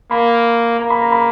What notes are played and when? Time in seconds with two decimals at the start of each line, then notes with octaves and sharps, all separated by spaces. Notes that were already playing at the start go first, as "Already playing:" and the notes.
0.11 A#3 B5
0.79 A#3 A#5
0.90 B5
1.01 A#5
1.12 B5